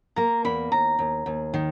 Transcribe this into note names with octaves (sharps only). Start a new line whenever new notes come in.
A#3 A#5
E2 B5
D#2 A#5
D#2
D#2
D#3